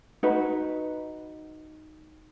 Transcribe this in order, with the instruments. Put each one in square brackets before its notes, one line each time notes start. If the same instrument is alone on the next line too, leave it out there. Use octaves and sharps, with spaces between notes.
[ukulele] D#4 F#4 B4